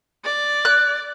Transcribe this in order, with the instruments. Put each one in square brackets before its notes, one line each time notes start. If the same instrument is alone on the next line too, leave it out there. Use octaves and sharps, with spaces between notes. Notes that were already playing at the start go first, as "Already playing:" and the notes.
[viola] D5
[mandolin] F#6